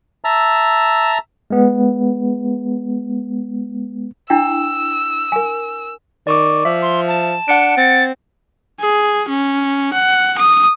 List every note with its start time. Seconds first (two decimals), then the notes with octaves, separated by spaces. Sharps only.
0.25 E5 A5 A#5 E6
1.50 G#3 B3
4.30 D4 E4 G5 E6
5.32 A#4 G#5
6.27 D#3 D5 C#6 D6
6.65 F3 E5
6.82 C6
7.08 A5
7.48 D4 F#5 C#7 D7
7.77 C4 A6
8.80 G#4
9.29 C#4
9.93 F#5
10.38 D#6